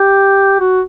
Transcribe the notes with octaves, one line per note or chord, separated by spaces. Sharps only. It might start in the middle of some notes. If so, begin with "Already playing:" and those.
Already playing: G4
F#4